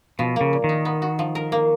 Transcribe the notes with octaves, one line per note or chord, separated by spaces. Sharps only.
B2 F3
C#3 A#3
A#2
D#3
D#4
B3
F#4
F3
A#4
A#3